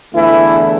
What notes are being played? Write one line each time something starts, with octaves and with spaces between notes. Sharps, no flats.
E2 D3 E3 A3 E4